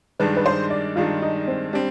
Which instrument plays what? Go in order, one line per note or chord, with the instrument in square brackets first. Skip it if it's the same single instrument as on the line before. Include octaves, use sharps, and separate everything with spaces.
[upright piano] G2 D#3 G#3 D4 [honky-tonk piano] B4
[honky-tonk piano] B4
C5
D5
[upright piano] G2 D#3 G#3 D4 [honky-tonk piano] F4
[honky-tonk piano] D#4
C4
[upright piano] G3 C4 [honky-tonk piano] D4